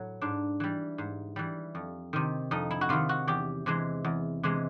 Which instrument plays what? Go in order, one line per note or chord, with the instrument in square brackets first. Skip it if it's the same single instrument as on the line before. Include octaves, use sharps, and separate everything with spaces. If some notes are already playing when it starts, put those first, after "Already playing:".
Already playing: [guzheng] A2 F#3
G#2 D4
E3 G3
G#2
E3 G3
F2
C3 D#3
F2 D#4
E4
F#4
C3 D#3 F4
F#4
E2 G4
C3 E3 G#3
E2
C3 E3 G#3